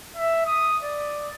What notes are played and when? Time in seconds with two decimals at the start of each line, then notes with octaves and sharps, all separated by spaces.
0.17 E5
0.46 D#6
0.83 D5